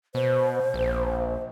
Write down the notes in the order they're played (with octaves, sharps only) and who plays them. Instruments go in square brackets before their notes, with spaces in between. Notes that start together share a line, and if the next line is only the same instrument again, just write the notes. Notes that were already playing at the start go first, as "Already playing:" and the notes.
[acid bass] B2 [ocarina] C5
[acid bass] A#1